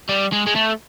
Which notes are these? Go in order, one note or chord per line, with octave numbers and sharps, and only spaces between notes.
G3
G#3
G#3
A3